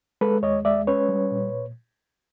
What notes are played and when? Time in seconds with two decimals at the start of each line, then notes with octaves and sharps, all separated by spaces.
0.21 G#3 A4 B4
0.43 D#2 C#5 D#5
0.65 G#3 D5 E5
0.87 C#4 B4 C#5
1.09 G3
1.31 A#2